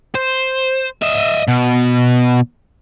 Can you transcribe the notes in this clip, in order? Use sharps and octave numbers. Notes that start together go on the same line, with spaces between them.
C5
D#5 E5
B2